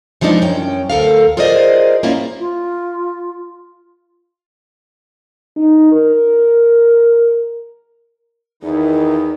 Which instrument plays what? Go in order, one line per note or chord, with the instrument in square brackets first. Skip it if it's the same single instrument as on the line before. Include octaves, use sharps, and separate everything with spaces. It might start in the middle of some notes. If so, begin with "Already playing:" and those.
[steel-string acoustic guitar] E3 F3 G#3 D4 D#4
F#2 C#4 G5
D2 A4 A#4 F5
F4 G#4 A#4 C5 D5 D#5
A#3 C#4 E4 F4
[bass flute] F4
[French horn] D#4
A#4
[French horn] E2 [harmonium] D#3 E4 [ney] D#4